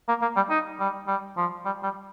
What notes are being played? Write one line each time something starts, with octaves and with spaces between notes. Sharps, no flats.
A#3
A#3
G3
D#4
G3
G3
F3
G3
G3